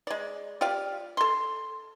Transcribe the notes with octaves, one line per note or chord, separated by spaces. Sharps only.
G#3 D5
F4 G4 D5 F5
A4 C6